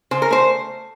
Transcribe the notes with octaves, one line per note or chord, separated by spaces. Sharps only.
C#3 C5
A#4
A3 C5